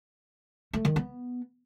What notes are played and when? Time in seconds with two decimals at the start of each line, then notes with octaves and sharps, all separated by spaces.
0.73 A3
0.85 D#3
0.96 B3